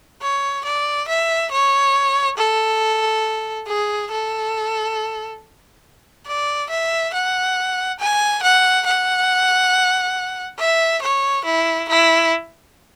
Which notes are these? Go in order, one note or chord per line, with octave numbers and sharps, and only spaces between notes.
C#5
D5
E5
C#5
A4
G#4
A4
D5
E5
F#5
G#5
F#5
F#5
E5
C#5
E4
E4